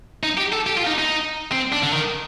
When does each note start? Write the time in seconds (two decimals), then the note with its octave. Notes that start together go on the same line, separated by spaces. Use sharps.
0.23 D#4
0.38 G4
0.52 A4
0.67 G4
0.77 F4
0.87 D#4
0.99 D#4
1.52 C4
1.72 D4
1.83 D3
1.93 D#3